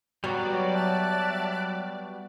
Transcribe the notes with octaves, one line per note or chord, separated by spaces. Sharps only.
F#3 G3 B3 F#4 D5
E5 A5 F#6